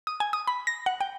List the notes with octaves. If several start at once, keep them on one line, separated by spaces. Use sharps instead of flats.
D#6
G#5
D#6
B5
A#6
F#5
G5